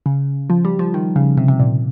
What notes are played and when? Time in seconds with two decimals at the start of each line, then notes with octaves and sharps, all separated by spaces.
0.06 C#3
0.50 F3
0.65 G3
0.79 F3
0.94 D#3
1.16 C#3
1.37 C3
1.48 C3
1.60 A#2